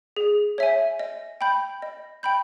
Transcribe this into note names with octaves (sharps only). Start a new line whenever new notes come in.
G#4
C#5 E5 G#5
D#5
G5 B5 G6
D#5
G5 B5 G6